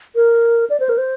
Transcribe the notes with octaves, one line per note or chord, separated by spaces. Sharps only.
A#4
D5
C5
A#4
C5